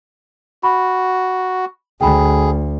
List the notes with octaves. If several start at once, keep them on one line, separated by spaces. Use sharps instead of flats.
F#4 B5
D2 G#4 G5 B5